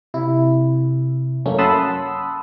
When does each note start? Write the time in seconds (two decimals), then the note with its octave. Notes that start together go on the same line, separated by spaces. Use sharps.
0.14 C3 E4
1.46 F#2 A3 A#3 C#4
1.59 F#5 A5 B5 C6 D#6 E6